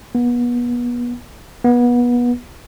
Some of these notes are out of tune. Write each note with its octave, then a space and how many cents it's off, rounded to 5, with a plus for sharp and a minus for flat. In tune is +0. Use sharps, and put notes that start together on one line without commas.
B3 -30
B3 -25